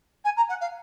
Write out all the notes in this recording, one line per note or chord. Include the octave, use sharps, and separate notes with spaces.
G#5
A#5
F#5
F5